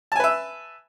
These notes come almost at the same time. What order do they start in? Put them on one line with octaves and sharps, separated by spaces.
A5 G#5 B4 E5